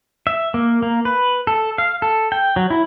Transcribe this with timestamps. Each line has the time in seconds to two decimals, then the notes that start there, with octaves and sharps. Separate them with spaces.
0.27 E5
0.54 A#3
0.82 A#3
1.05 B4
1.47 A4
1.78 F5
2.02 A4
2.32 G5
2.56 F#3
2.70 E4